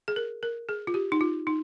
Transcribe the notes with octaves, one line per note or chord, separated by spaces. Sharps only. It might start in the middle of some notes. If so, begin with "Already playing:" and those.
G#4
A#4
A#4
G#4
F4
G4
D#4
F4
D#4